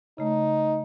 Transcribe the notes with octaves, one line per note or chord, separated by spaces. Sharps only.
C#3 A3 D#4